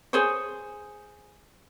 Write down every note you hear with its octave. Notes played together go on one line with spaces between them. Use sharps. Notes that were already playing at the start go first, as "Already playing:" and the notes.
G#4 C5 C#5